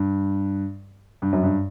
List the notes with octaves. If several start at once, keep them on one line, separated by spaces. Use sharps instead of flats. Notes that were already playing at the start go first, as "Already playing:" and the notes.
Already playing: G2
G2
F#2
G2